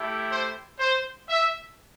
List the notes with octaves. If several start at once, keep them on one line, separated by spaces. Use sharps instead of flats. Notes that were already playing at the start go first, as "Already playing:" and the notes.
Already playing: A3 E4 G4
C5
C5
E5